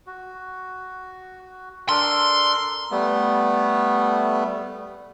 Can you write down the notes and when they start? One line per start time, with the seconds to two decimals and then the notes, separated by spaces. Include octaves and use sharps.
0.07 F#4
1.89 D4 A4 A#4 C6
2.91 G3 A3 B3